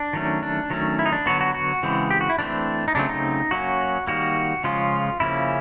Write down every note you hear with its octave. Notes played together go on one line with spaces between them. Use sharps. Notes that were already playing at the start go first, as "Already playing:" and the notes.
Already playing: D4
D#3 F#3 A3 C#4
D4
D#3 F#3 A3 C#4
E4
D#4
D4
D3 F#3 B3 F#4
F#4
F#4
C#3 E3 G#3 C4
G4
F#4
E4
E3 A3 C4 D4
D#4
C#3 F#3 A3 C4 D4
D#4
F#3 A#3 C#4 F#4
D#3 G3 A#3 F#4
C#3 F3 G#3 C#4 F4
C#3 F3 A#3 C#4 E4